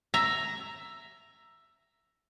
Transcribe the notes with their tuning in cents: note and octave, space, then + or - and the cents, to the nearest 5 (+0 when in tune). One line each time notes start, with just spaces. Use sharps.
E5 +10 A#5 +0